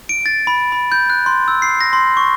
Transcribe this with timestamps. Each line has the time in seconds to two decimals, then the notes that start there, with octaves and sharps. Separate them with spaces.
0.09 D7
0.26 A6
0.47 B5
0.72 B5
0.92 G6
1.10 F#6
1.26 C6
1.48 E6
1.62 C7
1.81 A#6
1.93 C6
2.17 C#6